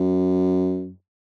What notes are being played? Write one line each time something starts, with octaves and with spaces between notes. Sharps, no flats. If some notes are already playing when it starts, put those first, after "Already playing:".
Already playing: F#2